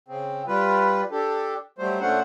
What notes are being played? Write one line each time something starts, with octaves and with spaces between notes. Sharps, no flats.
C#3 C4
G3 F4 B4
D4 G4 A4
F#3 G3 A3 C5
A#2 A3 C#4 D4 C5 F#5